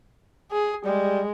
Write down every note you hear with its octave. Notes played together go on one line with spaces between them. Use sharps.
G#4
G3 G#3